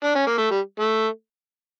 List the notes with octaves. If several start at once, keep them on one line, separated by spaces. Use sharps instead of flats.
D4
C#4
A#3
A3
G3
A3